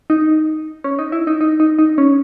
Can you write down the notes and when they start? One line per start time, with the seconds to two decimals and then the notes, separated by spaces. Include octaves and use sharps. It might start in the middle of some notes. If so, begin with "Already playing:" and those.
0.10 D#4
0.84 C#4
0.99 D#4
1.12 E4
1.27 D#4
1.41 D#4
1.60 D#4
1.79 D#4
1.98 C#4